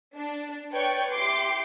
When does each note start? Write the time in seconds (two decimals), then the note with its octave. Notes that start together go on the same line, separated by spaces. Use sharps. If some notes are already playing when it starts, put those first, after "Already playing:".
0.15 D4
0.71 B4 C#5 D5 G5 C#6
1.11 E4 G4 C6 D6